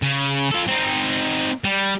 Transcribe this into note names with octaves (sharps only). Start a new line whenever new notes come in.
C#3
F4 A4
C4 D#4
G3